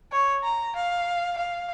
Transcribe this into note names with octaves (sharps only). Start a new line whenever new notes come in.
C#5
A#5
F5
F5